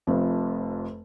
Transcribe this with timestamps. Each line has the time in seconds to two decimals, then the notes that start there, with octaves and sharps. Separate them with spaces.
0.07 F1 F2